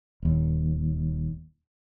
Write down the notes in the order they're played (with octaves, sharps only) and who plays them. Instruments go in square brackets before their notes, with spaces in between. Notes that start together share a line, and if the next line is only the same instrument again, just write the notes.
[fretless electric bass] D#1 D#2